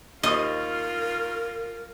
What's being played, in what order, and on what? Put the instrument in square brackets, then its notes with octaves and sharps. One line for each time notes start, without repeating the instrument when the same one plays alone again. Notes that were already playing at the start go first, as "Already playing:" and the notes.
[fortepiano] D#2 D#6 [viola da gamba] F4 [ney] A#4 [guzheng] D#5